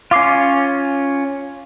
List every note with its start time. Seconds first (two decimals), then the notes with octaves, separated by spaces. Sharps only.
0.11 C#4 F4 F5 D6 C7